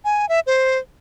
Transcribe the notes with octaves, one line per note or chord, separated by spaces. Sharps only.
G#5
E5
C5